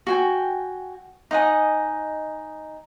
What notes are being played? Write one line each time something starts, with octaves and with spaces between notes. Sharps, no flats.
F#4 G5 G#5
D#4 D#5 F#5 G#5